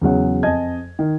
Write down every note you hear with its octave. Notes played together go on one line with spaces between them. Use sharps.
E2 C#3 F#3 F#5
F2 D#5 G#5 A5 G#6
D#3